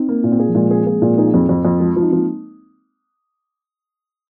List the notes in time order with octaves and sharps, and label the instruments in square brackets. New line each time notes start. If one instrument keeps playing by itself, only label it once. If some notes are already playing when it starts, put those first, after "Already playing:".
Already playing: [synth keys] C4 D#4
[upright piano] A#3
A#2
[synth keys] C4
[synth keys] A#3 [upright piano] G#4
[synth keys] F3
[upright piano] A#2 [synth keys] G#3
[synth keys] C4 [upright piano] G#4
[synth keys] A#3 [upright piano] G#4
[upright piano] A#2 [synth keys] A#3
[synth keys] D#4 [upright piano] G#4
[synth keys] A#3
[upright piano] F2 [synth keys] C4
[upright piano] F2
F2
[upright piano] F3 [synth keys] G#3
[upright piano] F3
[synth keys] D#4
[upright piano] F3 [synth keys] C4
[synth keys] A#3